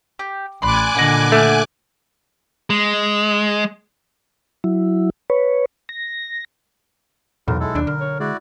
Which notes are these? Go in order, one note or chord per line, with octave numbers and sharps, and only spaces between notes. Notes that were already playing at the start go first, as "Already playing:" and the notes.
G4
A1 D5 G#5 B5 C6 D6 F#6
A#2 D3 D#5 F#5 B5
A3
G#3
F#3 E4
B4 C#5
A#6
B1 E2 F4 A#4
G#3 E4 A4
D#2 D4
D3 A#4
C#5
G#3 E4 F#4 D5